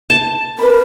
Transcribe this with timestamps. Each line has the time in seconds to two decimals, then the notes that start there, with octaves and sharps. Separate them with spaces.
0.10 A5
0.59 A#4 B4 B5